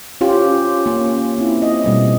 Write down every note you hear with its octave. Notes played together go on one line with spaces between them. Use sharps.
C#4 F4 G4
A#3 C#4
A#3 C4 E4
D#5
B2 G3 A3